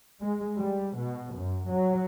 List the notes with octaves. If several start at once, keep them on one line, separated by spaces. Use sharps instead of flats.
G#3
G3
B2
F#2
F#3